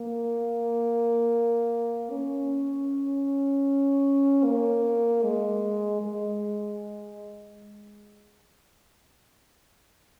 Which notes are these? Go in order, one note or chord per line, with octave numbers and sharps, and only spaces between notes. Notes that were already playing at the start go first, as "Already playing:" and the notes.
Already playing: A#3
C#4
A#3
G#3
G#3